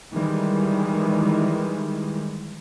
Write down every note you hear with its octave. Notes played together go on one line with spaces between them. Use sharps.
D#3 E3 G3 G#3